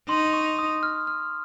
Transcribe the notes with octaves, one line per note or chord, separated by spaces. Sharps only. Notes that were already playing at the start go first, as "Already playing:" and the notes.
D#4 C6
C#6
D#6
F6
F6